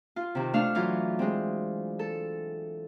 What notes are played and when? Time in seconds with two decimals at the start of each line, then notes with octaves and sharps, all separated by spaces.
0.16 F4
0.35 C3 D#3
0.54 A3 D4 F5 F6
0.75 E3 F#3 F4
1.19 G#3 C4
1.99 A4